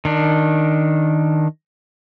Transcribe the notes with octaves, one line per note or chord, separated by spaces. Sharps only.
D#3 D4